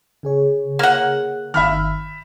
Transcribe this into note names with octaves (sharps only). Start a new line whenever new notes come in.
C#3 G#4 C#5
A#3 F#5
G1 D#3 E5 B5 F6